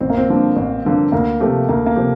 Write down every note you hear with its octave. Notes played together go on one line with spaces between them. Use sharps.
A1 C4
A#3
C4
G2 D3 F3 A#3
A1
G2 D3 F3 A#3
D2 A#3
C3 F3 A3 C4 G4
D2 A#3
A#3
C3 F3 C4 G4